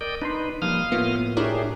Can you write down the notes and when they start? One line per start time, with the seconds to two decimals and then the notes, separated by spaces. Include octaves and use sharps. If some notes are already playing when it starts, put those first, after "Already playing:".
0.01 A#4 D5 D#5 G5
0.22 D4 D#4 B4 A#5 C6
0.62 F3 G3 A#3 F5 D#6 F6
0.92 A2 A#3 B3 F4
1.37 D4 E4 G4 G#4 A#4 C#5